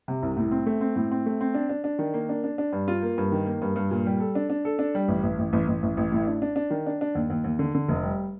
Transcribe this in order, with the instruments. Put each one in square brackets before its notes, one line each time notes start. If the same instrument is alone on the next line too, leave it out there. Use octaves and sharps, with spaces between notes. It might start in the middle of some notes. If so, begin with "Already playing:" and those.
[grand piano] C3
C2
A2
C4
A3
C4
A2
C4
A3
C4
D4
D4
D4
D#3
A#3
D4
D4
D4
G2
F4
A#3
G2
D#3
A#3
G2
G2
A#2
G3
A4
D4
D4
A4
D4
G3
A1
A1
A1
A1
A1
A1
A1
A2
D4
D4
D4
D#3
D4
D4
D#2
D#2
D#2
D3
D3
F1
G3